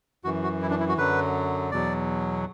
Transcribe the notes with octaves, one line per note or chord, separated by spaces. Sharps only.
F#2 E3 F#4
F#4
E4
D4
E4
F#4
F#2 D3 F#3 B4
E2 B2 F#3 D5